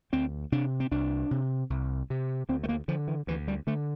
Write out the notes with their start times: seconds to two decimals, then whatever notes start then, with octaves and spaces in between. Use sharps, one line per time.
0.13 D2 C4
0.52 C3 D4
0.80 C4
0.91 C2 D4
1.31 C3
1.70 C2
2.10 C3
2.49 D2 C4
2.63 A3
2.69 A#3
2.88 D3 F3
3.08 E3
3.27 D2 E3
3.48 G3
3.67 D3 A3